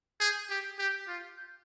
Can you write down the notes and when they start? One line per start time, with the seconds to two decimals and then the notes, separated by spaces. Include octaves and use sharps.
0.20 G#4 G6
0.50 G4
0.79 G4 G6
1.08 F4
1.37 G6